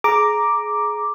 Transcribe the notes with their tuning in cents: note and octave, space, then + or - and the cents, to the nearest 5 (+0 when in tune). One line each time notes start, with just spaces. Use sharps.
G#4 +25 A#5 +0 D6 +0